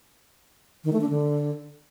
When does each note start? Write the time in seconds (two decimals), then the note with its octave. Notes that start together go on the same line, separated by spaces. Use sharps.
0.84 D#3
0.92 A3
1.01 D4
1.09 D3